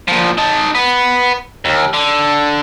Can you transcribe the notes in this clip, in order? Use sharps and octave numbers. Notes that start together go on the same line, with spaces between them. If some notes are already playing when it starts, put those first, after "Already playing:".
A#2 F3
D#4 A5
B3
D#2
D3